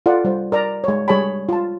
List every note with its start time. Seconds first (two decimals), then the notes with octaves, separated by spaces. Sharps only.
0.06 F4 A4 D5 F#5
0.25 G3 C5
0.52 A#4 D5 A#5
0.84 G#3 C#5
1.08 G3 G#4 C#5 G#5 A5 B5
1.49 F4 A5